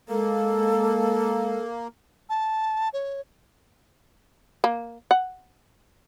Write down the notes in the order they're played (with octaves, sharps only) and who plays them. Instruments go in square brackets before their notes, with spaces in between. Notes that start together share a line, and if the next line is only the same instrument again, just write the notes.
[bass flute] G#3 [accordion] A#3 [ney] A4
[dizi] A5
C#5
[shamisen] A#3
F#5